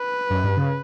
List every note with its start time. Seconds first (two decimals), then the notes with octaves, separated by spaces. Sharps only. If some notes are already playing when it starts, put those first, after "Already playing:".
Already playing: B4
0.30 F#2
0.44 G2
0.57 C#3